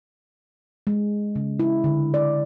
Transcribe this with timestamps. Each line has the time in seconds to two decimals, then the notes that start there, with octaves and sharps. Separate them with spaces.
0.87 G#3
1.35 C#3
1.60 E4
1.84 D3
2.14 D5